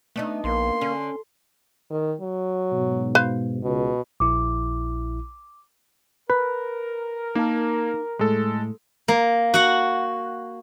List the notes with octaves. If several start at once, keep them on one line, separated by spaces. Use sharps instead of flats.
A3 B3 D4 D#4
A#1 A#3 C6
D3 C#4
D#3
F#3
G#2 B2
B4 C5 F5
C#2 B2
A#1 E4 D6
A#4 B4
A#3 D#4 F5 A5
A2 G#3 A4
A#3
F#4 F#5